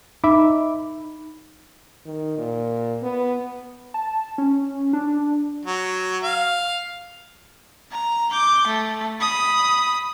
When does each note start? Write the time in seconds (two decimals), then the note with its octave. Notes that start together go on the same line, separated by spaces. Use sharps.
0.24 D#4 E5 B5 D6
2.06 D#3
2.38 A#2
3.03 B3
3.94 A5
4.38 C#4
4.93 D4
5.65 F#3
6.24 F5
7.91 A#5
8.31 D6 G6
8.67 A3
9.20 B5 D#6